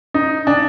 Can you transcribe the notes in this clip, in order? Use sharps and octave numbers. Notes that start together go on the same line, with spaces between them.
D#4
D4